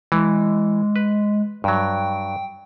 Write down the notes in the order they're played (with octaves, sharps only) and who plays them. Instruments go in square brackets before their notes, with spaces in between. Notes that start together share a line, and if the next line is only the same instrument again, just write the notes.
[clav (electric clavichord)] E3 [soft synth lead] G#3
[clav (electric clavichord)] B4
[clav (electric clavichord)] G2 F#3 [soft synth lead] G5